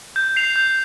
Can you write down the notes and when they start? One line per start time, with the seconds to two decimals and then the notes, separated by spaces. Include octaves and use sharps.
0.16 G6
0.36 C7 F7
0.56 G6